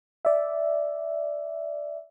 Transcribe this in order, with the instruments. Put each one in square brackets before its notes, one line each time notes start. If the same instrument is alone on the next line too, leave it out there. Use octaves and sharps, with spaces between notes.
[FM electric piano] D5 E5